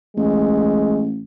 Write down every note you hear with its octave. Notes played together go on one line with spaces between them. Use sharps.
A1 G#3